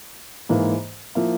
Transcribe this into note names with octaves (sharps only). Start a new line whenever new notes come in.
G#2 E3 A#3
F3 A#3 E4